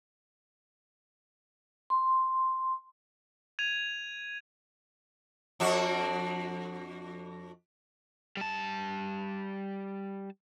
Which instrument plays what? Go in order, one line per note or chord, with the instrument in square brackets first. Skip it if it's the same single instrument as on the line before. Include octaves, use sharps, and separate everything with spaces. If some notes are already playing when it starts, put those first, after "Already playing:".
[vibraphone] C6
[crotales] G#6 D#7 F7
[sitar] F2 D4 F#4
[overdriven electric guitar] G3 A5